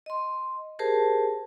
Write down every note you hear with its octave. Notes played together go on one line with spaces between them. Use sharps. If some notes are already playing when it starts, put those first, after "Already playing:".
D#5 C6
G4 G#4 A#4 C5 A5